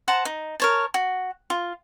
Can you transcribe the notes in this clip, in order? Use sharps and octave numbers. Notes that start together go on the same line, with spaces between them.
C5 F#5 A5 A#5
D#4
A#4 C#5 A5
F#4
F4